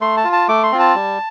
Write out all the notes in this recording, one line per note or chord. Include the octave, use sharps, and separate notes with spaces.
A3 C6
A5
F4
A5
A3 D6
C6
C4 F4
A5
G3